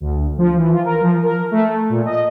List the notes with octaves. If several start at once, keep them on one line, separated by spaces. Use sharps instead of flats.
D2
F3
E3
F4
A#4
F3
A#4
A3
A#2
D#5